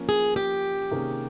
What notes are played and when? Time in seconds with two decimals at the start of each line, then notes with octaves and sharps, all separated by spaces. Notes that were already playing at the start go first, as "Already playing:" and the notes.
Already playing: F3 A#3 C#4
0.09 G#4
0.36 G4
0.91 C3 D#3 A#3 C#4 G#4